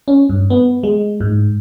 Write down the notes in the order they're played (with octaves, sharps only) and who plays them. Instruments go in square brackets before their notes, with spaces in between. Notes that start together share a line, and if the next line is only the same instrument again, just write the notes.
[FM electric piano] C#4
G2
B3
G#3
G#2